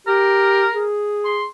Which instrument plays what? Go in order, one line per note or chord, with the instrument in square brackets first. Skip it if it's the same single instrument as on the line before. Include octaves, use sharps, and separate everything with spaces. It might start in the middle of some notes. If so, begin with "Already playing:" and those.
[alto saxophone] G4 [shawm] A#4
[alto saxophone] G#4
[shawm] C6